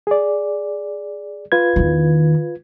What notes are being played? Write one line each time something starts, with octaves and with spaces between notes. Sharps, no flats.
G#4 D5
F4 B4 G#6
E2 D#3